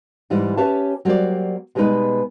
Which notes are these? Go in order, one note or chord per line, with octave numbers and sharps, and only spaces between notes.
G#2 E3 G3
C#4 G4 B4 C#5 E5 A5
F#3 G3 A#3 C5 D5
B2 G3 G#3 B3 D#4 B4